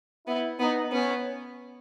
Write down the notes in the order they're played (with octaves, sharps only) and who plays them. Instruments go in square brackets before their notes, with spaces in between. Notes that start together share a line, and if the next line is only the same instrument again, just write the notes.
[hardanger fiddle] B3 [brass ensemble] E4
[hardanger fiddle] B3 [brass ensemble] D#4
[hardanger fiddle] B3 [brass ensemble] C#4